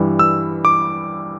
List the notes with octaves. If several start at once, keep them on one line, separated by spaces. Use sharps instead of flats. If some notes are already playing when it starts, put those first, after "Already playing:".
Already playing: G2 E3 G3
E6
D6